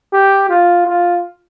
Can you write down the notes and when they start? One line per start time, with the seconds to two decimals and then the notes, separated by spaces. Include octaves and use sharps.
0.13 G4
0.50 F4
0.87 F4